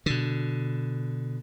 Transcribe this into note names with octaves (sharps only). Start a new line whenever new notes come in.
B2 D3